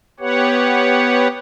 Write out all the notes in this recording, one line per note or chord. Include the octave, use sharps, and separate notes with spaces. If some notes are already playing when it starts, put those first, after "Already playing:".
B3 G4 B4 C#5 F#5